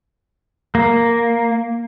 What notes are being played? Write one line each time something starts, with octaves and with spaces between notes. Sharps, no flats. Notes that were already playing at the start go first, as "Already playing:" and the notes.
A#3